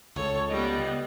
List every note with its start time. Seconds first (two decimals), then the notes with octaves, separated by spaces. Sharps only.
0.16 C#2 A4 C#5
0.50 G3 B3 D#5